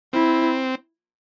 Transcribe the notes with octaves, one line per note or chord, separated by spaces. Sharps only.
C4 E4